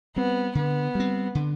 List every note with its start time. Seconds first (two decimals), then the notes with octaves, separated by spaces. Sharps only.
0.16 G3 B3 C4
0.55 D3 B3
0.95 G3 C4
1.35 D3